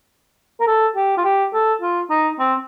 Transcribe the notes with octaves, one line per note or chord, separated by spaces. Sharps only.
A#4
A4
G4
F4
G4
A4
F4
D#4
C4